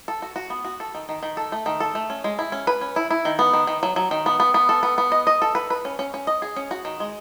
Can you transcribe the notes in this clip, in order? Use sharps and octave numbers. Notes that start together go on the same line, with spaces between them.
A4
F#4
F#4
B3
F#4
A4
D#3
D#3
D#3
A4
A3
D#3
A4
A3
C#4
G#3
E4
C#4
B4
C#4
E4
E4
D#3
B3
D#3
D#3
F#3
F#3
D#3
B3
B3
B3
A4
B3
B3
D#5
D#5
A4
B4
B4
C#4
C#4
C#4
D#5
G#4
C#4
F#4
D#3
G#3